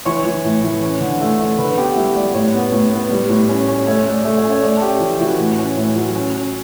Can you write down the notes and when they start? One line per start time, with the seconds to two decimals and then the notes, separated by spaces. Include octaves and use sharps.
0.05 E3 C#5 C#6
0.25 E3
0.44 A2
0.64 E3
0.82 C#4
1.01 D3
1.21 A3
1.40 A3
1.58 D3 B4 B5
1.77 B3 G4 G5
1.89 F#5
1.96 G3 E4 E5
2.15 G3 D5
2.34 A2 C#5
2.54 B3
2.72 A2
2.91 B3
3.10 G3
3.29 A2
3.49 C#4
3.68 C#4
3.86 A3 C#5
4.05 A3
4.12 D5
4.24 A3
4.37 C#5
4.44 C#4
4.50 C#5
4.62 A3 D5
4.77 A5
4.81 C#4 G4 G5
5.00 E3
5.14 G5
5.20 E3 F#4 F#5
5.39 A2
5.58 C#4
5.77 A2
5.96 F#3
6.15 C#4
6.34 C#4